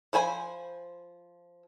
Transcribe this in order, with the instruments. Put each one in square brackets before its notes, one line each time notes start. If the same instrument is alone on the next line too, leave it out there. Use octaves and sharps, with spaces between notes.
[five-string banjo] F3 C5 G#5 B5